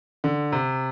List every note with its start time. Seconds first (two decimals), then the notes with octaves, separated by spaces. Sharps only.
0.24 D3
0.52 C3